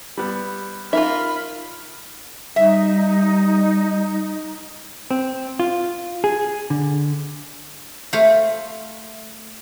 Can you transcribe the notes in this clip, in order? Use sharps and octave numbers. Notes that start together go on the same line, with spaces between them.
G3 B3
D#4 F4 A#4 E5 B5 F6
G3 D#4 E5
C4
F4
G#4
D3
A3 C5 F5